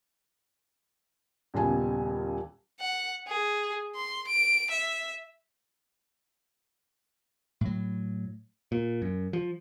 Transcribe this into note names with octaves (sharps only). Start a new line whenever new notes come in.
D#1 A#2 C#3 B3 G#5 A5
F#5
G#4
C6
D7
E5
A2 F#3
A#2
F#2
F3